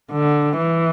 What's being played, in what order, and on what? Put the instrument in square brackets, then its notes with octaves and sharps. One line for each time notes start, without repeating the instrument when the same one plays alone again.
[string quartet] D3
E3